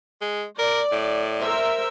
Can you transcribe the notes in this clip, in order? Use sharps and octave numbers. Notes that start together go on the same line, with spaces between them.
G#3
A#4 D5
A2
A#4 C5 E5